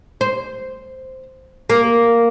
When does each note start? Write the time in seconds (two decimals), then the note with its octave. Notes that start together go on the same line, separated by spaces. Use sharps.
0.21 C5
1.70 A#3